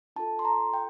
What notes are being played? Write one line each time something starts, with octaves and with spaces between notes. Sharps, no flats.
D4 F4 A4 A5
C6
A#5
G5